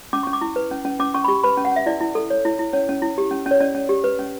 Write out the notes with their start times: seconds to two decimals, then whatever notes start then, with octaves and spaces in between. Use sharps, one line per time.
0.13 C#4 D6
0.23 C#4 C#6
0.33 D6
0.41 E4
0.56 B4
0.71 C#4
0.85 C#4
0.99 C#4 D6
1.14 C#4 C#6
1.24 B5
1.28 G4 C#6
1.43 B4 B5
1.57 C#4
1.65 F#5
1.72 C#4 E5
1.86 E4 D5
2.01 E4
2.15 A4
2.30 C#5
2.45 E4
2.59 E4
2.73 C#4 C#5
2.89 C#4
3.02 E4
3.18 G4
3.31 C#4
3.46 C#4
3.51 C#5
3.60 C#4 D5
3.75 C#4
3.89 G4
4.04 B4
4.19 C#4